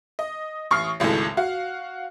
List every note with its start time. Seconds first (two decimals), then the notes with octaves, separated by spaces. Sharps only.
0.19 D#5
0.71 A1 C#6 D#6 F6 C7
1.00 G#1 C#2 A2 G#3 A4
1.37 F#4 F5